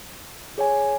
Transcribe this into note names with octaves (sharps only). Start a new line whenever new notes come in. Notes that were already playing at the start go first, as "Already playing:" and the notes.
G#4 C#5 G#5